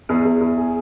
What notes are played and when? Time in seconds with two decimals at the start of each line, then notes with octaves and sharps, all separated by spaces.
0.09 E2
0.25 E2
0.41 E2
0.58 G#4